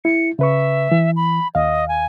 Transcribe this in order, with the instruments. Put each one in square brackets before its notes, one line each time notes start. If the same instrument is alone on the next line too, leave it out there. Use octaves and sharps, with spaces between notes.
[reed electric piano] E4 [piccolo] C#7
[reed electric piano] C#3 B4 C#6 [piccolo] E5
[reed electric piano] E3
[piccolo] B5
[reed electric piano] D#2 F5 [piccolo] D#5
[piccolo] G#5